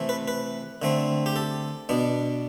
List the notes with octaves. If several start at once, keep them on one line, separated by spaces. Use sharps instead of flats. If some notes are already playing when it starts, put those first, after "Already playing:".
Already playing: C3 E3 A3
B4
B4
D3 A3 C4
G4
A4
B2 B3 D4